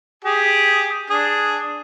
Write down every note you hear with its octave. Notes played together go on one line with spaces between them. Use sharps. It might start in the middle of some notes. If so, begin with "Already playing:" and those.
G4 G#4
D4 G#4